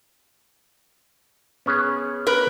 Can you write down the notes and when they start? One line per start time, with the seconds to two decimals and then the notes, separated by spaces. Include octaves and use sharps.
1.66 B3 C#4 G#4
2.27 A#4 B4